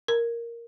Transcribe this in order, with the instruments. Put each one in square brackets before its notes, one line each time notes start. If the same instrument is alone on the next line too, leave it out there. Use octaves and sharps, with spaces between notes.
[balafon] A#4